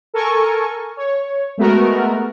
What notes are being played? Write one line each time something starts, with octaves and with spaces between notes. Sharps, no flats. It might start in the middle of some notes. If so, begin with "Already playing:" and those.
A4 A#4 G#5 C#6
C#5
G#3 A3 B3 F#4 A#4